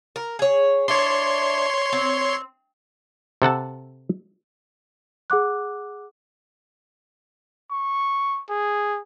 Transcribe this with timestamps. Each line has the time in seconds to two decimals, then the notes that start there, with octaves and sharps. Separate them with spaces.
0.16 A#4
0.39 G#4 C#5
0.88 D4 E4 C#5 C6
1.93 C4
3.42 C3 A4 F#5 A5
5.30 G#4 F#5 D6 F#6
7.71 C#6
8.49 G#4